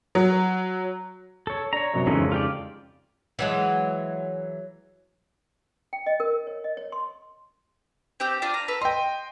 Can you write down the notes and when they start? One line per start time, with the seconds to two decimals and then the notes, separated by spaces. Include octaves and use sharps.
0.15 F#3
1.47 A4 C#5
1.73 D4 C#5 A#5
1.94 F#2 C3 F#3
2.07 G#1 F2 C#3 E3 C#4 D#4
2.32 F4 G4 D5
3.39 E3 F#3 G#3
5.93 G5
6.06 D#5
6.20 A#4
6.47 C#5
6.64 D#5
6.77 C#5
6.92 C6
8.20 C4 G4 G6
8.42 D4 F4
8.54 A#5
8.68 A4 B4
8.82 D#5 G5 C6